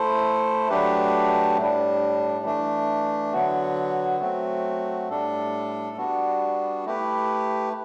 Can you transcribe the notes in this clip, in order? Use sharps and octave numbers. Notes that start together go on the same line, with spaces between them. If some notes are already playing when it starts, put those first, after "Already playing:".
Already playing: A3 E4 A4 C5
F#3 A3 D4 G4 B4
A2 G3 D4
E3 A3 D4
D3 F#3 B3 F#4
F#3 A3 C4 F#4
A2 G3 D4 A4
G3 B3 D4 F#4
A3 E4 G4 B4